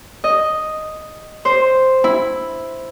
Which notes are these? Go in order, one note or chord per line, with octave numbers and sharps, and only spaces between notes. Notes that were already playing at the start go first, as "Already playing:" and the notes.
D#5
C5
E4